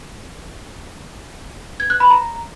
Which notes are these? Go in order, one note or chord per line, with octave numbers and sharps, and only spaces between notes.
G#6
F#6
B5
A#5